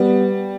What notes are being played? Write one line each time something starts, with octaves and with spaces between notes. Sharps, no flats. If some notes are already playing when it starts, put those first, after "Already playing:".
Already playing: G3 B3